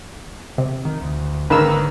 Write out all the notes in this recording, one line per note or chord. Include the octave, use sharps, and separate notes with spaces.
C3
D#3
D2
G#1 G#2 D3 D#3 A#3 B4 E6